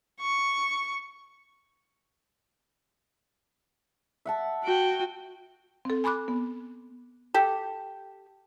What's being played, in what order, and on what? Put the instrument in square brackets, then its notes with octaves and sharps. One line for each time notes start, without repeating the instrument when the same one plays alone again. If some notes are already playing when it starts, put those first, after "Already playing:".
[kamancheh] C#6
[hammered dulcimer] E5 F#5 A5
[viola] F#4 G5
[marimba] C4 A4
G#5 B5 C6 D6 F#6
B3
[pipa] G4 A4